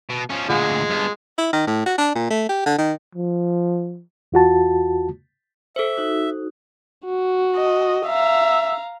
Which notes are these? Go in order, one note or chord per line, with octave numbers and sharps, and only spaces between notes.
B2
F3 C#4
D2 A#2 G#3 F4 G#4 F#5
G2 B3
E4
D#3
A2
F#4
D4
A#2
A3
G4
D3
D#3
F3
E2 F4 F#4 A5
A4 C5 E5
D#4 F#4
F#4
D#5
E5 F5 A#5